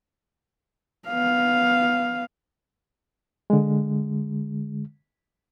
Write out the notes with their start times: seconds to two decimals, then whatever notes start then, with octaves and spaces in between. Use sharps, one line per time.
1.08 B3 F5
3.50 D3 G#3